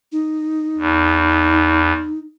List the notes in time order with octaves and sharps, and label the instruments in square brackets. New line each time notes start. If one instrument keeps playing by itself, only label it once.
[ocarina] D#4
[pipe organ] E2